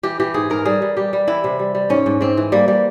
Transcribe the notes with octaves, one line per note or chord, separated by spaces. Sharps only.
E3 G4
E3 G4
G#2 G#4
G#2 A#4
G3 G#4
G3
G3 G4
G3
E3 E4
C3
G3
G3
G#2 C#4
G#2
G#2 C4
E3
G3 A#3
G3